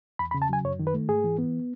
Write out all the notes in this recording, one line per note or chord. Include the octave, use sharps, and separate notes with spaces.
E2 B5
B5
C#3
A5
F#3 G#5
F#2 C#5
D#3
B4
A3
G#2 G#4
E3
B3